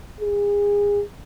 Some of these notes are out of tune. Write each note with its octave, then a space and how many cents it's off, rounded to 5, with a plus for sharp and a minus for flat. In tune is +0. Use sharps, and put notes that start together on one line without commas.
G#4 -30